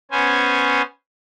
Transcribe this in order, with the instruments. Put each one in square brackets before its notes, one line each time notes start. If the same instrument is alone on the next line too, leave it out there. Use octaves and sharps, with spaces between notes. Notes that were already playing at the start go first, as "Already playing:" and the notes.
[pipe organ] B3 C#4 C5 G#5